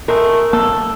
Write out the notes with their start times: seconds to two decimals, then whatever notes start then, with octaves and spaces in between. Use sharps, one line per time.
0.08 G#3 A3 A#4
0.53 A#3 A4